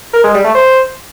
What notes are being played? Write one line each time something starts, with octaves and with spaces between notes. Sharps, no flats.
A#4
G#3
G3
A3
C5